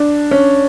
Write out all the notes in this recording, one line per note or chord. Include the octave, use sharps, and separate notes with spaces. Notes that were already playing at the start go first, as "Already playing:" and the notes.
Already playing: D4
C#4